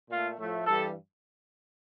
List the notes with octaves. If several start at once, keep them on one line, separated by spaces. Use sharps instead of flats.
A#2 A3 F4
A2 F3 A3
G2 E3 G3 A4